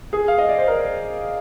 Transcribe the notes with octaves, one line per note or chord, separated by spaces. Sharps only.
G#4
F5
D#5
D5
C5
A#4